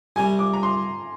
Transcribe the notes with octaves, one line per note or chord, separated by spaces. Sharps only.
C2 C3 G3 G#5
D6
A#5
C6